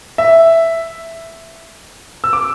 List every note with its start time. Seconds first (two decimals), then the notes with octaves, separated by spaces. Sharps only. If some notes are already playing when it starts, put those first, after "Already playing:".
0.18 E5
2.24 E6
2.33 D6